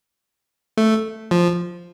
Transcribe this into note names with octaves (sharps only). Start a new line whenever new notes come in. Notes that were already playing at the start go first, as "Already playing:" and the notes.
A3
F3